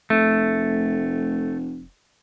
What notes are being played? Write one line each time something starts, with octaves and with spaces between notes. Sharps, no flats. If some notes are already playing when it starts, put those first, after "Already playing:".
F1 A3